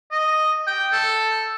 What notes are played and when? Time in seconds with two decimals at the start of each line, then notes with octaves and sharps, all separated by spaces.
0.11 D#5
0.67 G5
0.93 A4